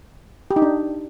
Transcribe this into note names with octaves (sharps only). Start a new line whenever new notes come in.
G4
D#4
D4